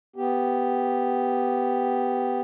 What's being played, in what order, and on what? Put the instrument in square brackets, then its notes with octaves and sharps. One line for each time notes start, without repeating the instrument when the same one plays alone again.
[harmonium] B3 G4